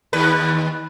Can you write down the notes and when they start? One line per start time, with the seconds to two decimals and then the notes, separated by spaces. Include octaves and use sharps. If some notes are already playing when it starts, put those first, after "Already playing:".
0.13 D#2 B4